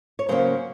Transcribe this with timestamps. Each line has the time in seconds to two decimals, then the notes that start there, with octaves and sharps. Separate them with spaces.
0.19 C#5
0.29 C#3 F#3 A#3 C#4 C5